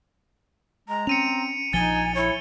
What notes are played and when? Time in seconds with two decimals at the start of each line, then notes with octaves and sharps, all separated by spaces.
0.88 G#3 A#5
1.07 C4 C#4 C#7 D#7 F7
1.73 A#1 F3 D#4 G#5 A6 G7
2.15 E4 C#5